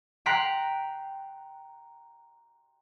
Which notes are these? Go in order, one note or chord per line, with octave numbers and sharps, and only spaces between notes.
G5 A#5 C6 F#6 B6 D7